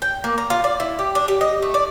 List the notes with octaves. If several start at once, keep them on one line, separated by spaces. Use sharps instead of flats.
G5
A#3
A#5
F4
D5
E4
G4
D4
G4
D#5
A3
D5